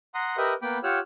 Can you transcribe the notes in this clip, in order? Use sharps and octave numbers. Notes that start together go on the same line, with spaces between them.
F#5 A#5 C6 D#6
G4 A#4 B4 D#5 E5 D#6
A#3 B3 G5 B5 D6
F4 G4 C#5 F#5 E6 F6